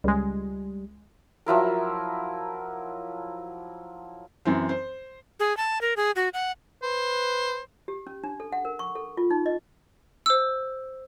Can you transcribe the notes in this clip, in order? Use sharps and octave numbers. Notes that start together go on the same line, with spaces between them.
C#2 G3 G#3
F3 F#3 E4 A#4
F#2 E3 C4
C5
G#4
A5
A#4
G#4
F#4
F#5
B4 C5
G4
C#4
D4
A4
F#5
A#4
C#6
A4
F4
D#4
D#5
C5 E6